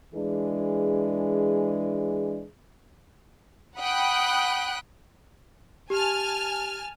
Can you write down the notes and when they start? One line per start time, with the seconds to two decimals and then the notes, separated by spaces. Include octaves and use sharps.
0.15 E3 G#3 D4 G#4
3.79 F#5 G5 B5 D#6 F#6
5.90 G4 G#5 A5 F6